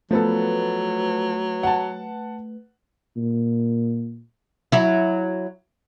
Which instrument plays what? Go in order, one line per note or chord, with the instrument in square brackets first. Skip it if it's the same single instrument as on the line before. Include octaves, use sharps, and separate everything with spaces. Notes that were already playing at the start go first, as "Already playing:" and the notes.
[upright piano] F3 B3 A4 [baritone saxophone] F#3 [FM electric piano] A3 B4
[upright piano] F#5 A5
[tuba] A#2
[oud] F#3 E4